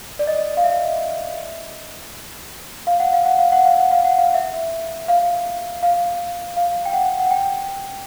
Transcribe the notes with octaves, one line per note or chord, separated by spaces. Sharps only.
D5
D#5
F5
E5
F5
F#5
F5
F#5
F5
F#5
F5
F#5
F5
F#5
F5
E5
F5
F5
F5
G5
F#5
F#5
G5